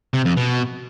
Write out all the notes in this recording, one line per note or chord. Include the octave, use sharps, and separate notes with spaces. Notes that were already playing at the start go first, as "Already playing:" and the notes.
C3
F2
B2